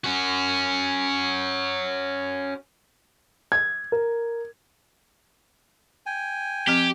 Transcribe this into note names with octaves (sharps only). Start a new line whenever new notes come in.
C#4 F#4
G#6
A#4
G5 G#5
F3 C4 G4